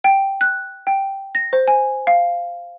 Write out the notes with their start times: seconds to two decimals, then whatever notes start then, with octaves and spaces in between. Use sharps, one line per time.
0.04 G5
0.41 F#6
0.87 G5
1.35 A#6
1.53 C5
1.68 G#5
2.07 F5